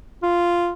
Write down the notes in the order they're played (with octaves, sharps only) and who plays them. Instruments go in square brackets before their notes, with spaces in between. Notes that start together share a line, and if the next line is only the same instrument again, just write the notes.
[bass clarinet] F4